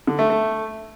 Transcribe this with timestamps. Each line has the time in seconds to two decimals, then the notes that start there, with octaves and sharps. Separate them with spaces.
0.07 D3
0.19 A3
0.30 A3